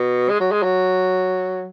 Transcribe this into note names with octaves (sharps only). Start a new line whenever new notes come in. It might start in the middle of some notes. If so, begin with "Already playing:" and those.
Already playing: B2
G#3
F#3
G#3
F#3